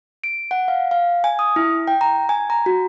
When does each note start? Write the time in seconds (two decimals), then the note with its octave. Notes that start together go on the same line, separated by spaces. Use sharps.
0.24 D7
0.51 F#5
0.68 F5
0.91 F5
1.24 G#5
1.39 D#6
1.56 E4
1.88 G5
2.01 A#5
2.29 G#5
2.50 A#5
2.66 F#4